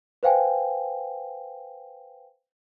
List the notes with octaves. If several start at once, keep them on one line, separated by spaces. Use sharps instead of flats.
B4 C5 F5 G5 G#5